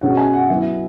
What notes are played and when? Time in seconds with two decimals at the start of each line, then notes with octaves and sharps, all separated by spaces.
0.01 B2 G#3 C#4 F#5
0.17 G#5
0.34 F#5
0.49 F#3 B3 E4 E5